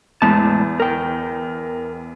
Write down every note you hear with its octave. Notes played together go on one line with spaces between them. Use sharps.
E2 A2 G#3 A5
A#4 G5